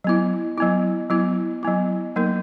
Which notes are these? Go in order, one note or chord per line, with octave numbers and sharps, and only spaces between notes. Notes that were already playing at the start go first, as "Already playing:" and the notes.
F#3 B3 E4
F#3 B3 E4
F#3 B3 E4
F#3 B3 E4
F#3 A#3 D#4 A#4